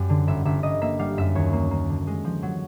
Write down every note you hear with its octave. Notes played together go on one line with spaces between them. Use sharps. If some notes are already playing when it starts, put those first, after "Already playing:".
Already playing: F#2 G3
D3
G1 E5
G1 E5
G1 D#5
A#3 E5
G3 F5
F#2 E5
D#2 C#5
A#3
A#3
D3
G#3
F3
F#3